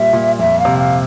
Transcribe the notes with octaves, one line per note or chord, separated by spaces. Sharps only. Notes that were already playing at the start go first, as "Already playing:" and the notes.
Already playing: A#2 G3 E5
A#2
F2 E5
F5
C3
F5